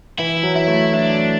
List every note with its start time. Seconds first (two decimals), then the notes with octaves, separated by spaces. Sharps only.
0.19 E3 E4
0.43 F#3
0.56 E4
0.68 A3
0.93 D4